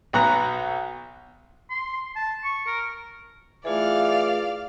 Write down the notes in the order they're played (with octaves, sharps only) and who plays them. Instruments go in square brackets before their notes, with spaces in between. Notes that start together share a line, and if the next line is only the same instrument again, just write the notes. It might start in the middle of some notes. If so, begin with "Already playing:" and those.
[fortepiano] B1 B3 F#4 A#5 F#6
[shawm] C6
A5
C#6
A#4
[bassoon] E3 [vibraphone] A3 F4 G#4 [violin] D5 F5